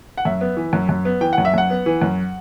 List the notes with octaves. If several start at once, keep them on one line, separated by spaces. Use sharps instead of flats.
F#5
F#2 E5
B3
E3
F#2
F#2
B3
E3 G5
F#5
F#2
E5
F#2 F#5
B3
E3
F#2